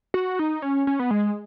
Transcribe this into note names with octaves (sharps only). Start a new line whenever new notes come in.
F#4
D#4
C#4
C#4
B3
G#3